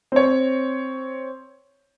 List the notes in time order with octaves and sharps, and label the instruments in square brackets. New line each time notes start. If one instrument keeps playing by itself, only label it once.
[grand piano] C4 C#5